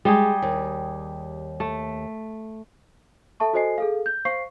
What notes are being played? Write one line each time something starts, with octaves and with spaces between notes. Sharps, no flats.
G3 G#3 G4 G#4
D#2
A3
A4 E5 A5 C#6
F#4 A4 C5 D#5 G#5 C7
G#4 A4 F5
G6
C5 F5 C#6 C7